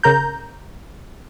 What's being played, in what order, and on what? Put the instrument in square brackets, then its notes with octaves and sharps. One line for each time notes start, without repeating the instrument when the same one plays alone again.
[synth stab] C#3 A#4 A#5 G6